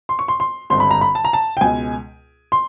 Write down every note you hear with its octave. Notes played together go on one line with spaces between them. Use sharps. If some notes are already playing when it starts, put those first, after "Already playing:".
C6
C#6
C6
C6
G#1 G2 D3 C6
B5
A#5
B5
A5
A#5
A5
G5
C#2 B2 G#3 G#5
C6